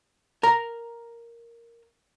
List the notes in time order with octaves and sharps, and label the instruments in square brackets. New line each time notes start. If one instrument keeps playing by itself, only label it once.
[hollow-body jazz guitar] A#4 A#5